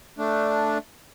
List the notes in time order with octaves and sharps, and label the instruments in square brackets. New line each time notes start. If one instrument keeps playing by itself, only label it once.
[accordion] A3 D4